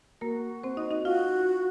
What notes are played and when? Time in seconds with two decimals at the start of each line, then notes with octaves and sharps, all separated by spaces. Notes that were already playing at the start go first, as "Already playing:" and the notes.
0.21 A#3 F#4 A#4
0.63 C4 C5
0.77 D#4 D#5
0.91 D#4 D#5
1.04 F4 F#4 F5